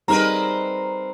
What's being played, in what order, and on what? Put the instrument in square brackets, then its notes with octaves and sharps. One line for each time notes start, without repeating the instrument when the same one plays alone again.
[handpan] G3 D#4 G#4 [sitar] C4 A#4 B4 [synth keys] A#5